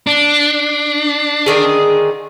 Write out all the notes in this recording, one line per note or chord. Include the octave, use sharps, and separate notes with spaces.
D4
D3 D#3 G#4